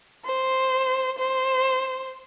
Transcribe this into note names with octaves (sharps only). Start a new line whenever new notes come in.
C5
C5